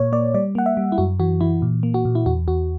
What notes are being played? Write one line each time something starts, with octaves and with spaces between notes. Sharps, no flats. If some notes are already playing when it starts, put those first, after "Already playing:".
Already playing: A#2 A#3 C#5
A#3 D5
G3 D5
A#3 F#5
E5
G3
E4
F#2 F#4
E3 F#4
E3 E4
A#2
A#3
F#4
A#2
E4
E2 F#4
E2 F#4